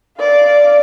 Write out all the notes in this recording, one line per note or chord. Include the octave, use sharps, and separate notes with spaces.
D5 F5